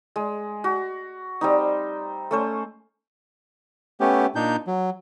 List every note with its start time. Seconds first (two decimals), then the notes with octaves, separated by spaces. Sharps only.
0.16 G#3
0.64 F#4
1.41 G3 C4 D#4
2.31 A3 C#4 C5
4.00 A3 B3 C#4 G4
4.35 A#2 D4 D#4 G6
4.67 F#3